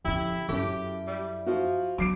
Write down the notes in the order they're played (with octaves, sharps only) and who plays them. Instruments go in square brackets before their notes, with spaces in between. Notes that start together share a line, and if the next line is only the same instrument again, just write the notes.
[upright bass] F2 C#3 [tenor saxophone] E4 [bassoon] G4
[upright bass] F#2 [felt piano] C#4 A4 [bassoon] E4 [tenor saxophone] G4
[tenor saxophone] G3
[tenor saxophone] F3 [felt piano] F#4
[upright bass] F#3 [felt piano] D6 C7 D7